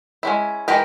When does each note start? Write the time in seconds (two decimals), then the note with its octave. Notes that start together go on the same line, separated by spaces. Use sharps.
0.23 G#3 C#4 E4
0.68 E3 G#3 G4 A#4